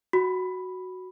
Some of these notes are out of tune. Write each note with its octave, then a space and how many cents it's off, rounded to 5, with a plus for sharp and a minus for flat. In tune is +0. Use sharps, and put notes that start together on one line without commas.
F#4 +0 B5 +0